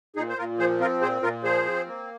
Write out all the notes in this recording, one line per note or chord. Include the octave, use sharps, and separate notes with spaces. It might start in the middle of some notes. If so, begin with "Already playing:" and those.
A#2 D#4 G#4
C5
A#2 F4 A#4
F3 G#4 C5
C4 F4 A#4
A#2 G#4 C5
A#2 F4 A#4
F3 G#4 C5
C4
A#3